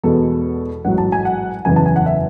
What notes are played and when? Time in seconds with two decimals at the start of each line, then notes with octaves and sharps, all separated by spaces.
0.04 E2 B2 G#3 B3 A4
0.85 A1 G#2 F#3 F#5
0.98 A5
1.12 G#5
1.25 F#5
1.65 F#1 E2 C#3 E3 G#5
1.76 A5
1.86 G#5
1.96 F#5
2.06 E5